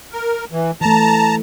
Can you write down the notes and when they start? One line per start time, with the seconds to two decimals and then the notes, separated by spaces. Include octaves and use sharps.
0.13 A#4
0.52 E3
0.81 E3 A3 A5 A#5